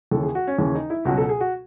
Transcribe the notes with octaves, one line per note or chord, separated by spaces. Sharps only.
D#2 C#3 E3 A4
G#4
F#4
C#4
D#2 C#3 E3 C#4
D#4
E4
C#2 B2 F#3 F#4
A4
G#4
F#4